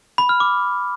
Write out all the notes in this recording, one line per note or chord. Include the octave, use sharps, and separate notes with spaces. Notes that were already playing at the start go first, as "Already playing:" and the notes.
B5
F6
D6